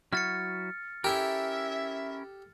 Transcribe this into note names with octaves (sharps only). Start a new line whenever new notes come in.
F#3 E4 F#4 F6 A6 C#7
C#4 E4 G4 A4 A#4 E5